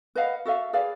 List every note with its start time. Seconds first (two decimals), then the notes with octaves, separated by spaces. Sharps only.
0.15 B4 D#5 F5 F#5
0.45 F#4 A4 E5 F5
0.73 G#4 B4 D5 F5